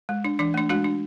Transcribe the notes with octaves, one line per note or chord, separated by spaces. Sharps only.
G#3
D4
E3 D4
A3 D4
G#3 D4 F#4
D4